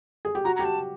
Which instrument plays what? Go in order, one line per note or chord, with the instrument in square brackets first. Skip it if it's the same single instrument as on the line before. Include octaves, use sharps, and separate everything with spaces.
[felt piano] G#4
G4
[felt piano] F#4 [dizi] A#5
[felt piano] G4 [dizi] A#5
[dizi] A5